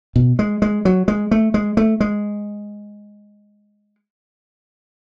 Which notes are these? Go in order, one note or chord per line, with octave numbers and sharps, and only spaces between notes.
B2
G#3
G#3
F#3
G#3
A3
G#3
A3
G#3